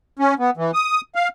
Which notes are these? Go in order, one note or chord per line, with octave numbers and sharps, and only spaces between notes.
C#4
B3
E3
D#6
F5